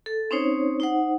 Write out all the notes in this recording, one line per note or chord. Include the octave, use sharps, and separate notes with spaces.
A4
C4 C#4 D#4 C5 C#5
D#4 C5 F#5